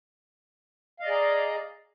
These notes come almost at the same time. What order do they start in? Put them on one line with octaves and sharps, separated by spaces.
F5 D#5 D5 G#4 A#5